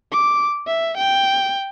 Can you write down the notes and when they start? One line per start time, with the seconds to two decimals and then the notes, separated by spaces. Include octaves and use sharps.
0.12 D6
0.67 E5
0.97 G5